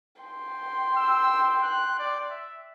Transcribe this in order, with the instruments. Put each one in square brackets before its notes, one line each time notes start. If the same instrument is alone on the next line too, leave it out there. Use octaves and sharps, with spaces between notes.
[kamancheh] G5 C6
[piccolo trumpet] E6
F#6
D5
E5